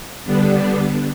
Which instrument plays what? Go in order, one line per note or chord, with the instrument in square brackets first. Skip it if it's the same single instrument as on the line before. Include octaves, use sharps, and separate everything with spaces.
[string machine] D3 G3 B3 D4